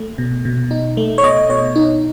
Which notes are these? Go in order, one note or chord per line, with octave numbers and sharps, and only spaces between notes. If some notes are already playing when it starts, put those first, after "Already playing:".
Already playing: A3
B2
B2
D#4
A3
C#5
B2 D#5
B2 C#5
D#4